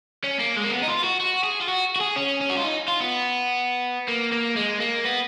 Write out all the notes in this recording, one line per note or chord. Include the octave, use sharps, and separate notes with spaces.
C#4
A#3
G#3
A#3
B3
D#4
F4
F#4
F#4
G#4
F4
F#4
F#4
G#4
C#4
C#4
F#4
F4
D#4
F4
B3
A#3
A#3
G#3
A#3
B3